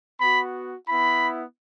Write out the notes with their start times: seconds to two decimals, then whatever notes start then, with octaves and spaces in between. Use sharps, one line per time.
0.20 B3 F#4 B5
0.88 B3 E4 B5